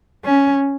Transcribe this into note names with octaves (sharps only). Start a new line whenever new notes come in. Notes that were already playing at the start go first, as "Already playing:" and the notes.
C#4